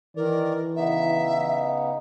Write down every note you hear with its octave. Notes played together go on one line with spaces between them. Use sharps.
D#3 E3 A#4 D5
C#3 B3 D#4 E5